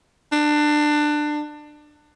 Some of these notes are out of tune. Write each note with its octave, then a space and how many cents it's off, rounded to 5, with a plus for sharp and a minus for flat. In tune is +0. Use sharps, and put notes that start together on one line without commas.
D4 +20